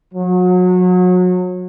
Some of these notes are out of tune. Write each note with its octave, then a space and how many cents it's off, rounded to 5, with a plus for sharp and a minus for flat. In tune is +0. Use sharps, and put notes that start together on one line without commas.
F#3 -30